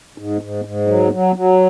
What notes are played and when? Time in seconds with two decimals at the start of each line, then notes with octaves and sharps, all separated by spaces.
0.18 G#2
0.41 G#2
0.65 G#2
0.88 F#3
1.12 F#3
1.36 F#3